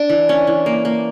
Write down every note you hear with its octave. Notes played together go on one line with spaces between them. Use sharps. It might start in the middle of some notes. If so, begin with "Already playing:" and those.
Already playing: D4
E3
C#4
E3
A#3
A#3